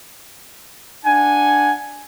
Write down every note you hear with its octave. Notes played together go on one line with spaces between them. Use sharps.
D4 F#5 G#5